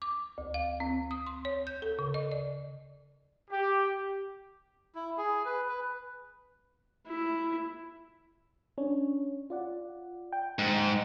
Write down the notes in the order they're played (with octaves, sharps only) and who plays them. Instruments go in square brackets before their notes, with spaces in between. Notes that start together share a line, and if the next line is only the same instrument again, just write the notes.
[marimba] D6
D2
F5
C4
D#6
C6
C#5
G6
A4
C#3
D#5
D5
[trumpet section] G4
[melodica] E4
G#4
B4
B4
[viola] E4
[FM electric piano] C#4 D4 C#5
F4 D5 F#5
G5
[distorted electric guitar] G#2